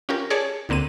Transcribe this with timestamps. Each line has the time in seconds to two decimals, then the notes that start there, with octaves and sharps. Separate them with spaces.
0.09 C#4 F4 G4 A#4
0.30 G#4 C#5 D5 A5
0.69 D2 D3 A#3 C4 D#7